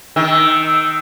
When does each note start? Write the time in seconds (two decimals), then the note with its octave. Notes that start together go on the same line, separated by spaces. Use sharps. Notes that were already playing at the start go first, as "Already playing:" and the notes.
0.16 D#3 E6